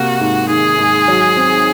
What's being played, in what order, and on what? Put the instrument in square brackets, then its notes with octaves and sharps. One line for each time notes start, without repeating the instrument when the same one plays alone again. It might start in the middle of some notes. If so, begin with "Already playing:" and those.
Already playing: [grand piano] C3 A#3 [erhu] F#4
[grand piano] G#2
[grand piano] D#3 [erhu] G#4
[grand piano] G#2
F#3
C4